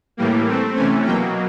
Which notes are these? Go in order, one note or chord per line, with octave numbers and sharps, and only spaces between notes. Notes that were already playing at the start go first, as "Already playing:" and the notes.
A2 E3 G3 A#3
E3 A3 C4
C3 E3 A3 C#4 G#5
B2 F#3 A#3 G5